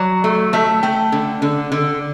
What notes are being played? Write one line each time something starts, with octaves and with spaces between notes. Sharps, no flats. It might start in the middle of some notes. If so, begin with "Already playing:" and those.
Already playing: F#3 D5
A3
A3 E5
A3 G5
D3
D3
D3